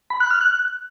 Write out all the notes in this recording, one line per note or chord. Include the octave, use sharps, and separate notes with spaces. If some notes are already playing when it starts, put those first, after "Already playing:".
B5
F#6
F6
F#6